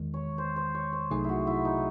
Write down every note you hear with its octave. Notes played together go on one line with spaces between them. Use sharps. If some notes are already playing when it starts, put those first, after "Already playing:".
Already playing: E2 D#3 G#3
C#5
C5
C5
C#5
C5
C2 C3 F#3 A3 D#4 G#4
E4 F#4
E4
D#4